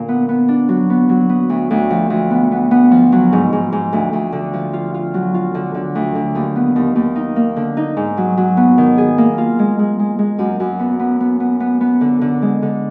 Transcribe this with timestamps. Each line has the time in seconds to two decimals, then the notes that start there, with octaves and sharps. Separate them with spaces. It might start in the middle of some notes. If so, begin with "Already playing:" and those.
Already playing: A#2 D3
0.09 B3
0.29 B3
0.48 D4
0.69 F#3
0.90 B3
1.09 F#3
1.29 B3
1.50 D2
1.71 D2
1.90 F3
2.10 D2
2.31 B3
2.51 B3
2.71 B3
2.91 F3
3.12 F#3
3.33 G#2
3.52 G#2
3.72 G#2
3.93 D2
4.13 D2
4.32 D3
4.53 F3
4.73 F4
4.94 F4
5.14 F#3
5.34 F4
5.54 D3
5.75 D3
5.95 D2
6.15 D3
6.35 D#2
6.56 B3
6.76 D#2
6.96 D#2
7.16 D#4
7.36 A#3
7.56 D3
7.77 D#4
7.97 G#2
8.17 F#3
8.37 F#3
8.57 B3
8.78 D#3
8.98 G#4
9.18 A#3
9.38 F4
9.59 G#3
9.79 G#3
10.00 G#3
10.19 G#3
10.39 F#2
10.60 F#2
10.79 B3
11.00 B3
11.20 B3
11.40 B3
11.60 B3
11.81 B3
12.01 D3
12.21 D3
12.42 G#3
12.62 D3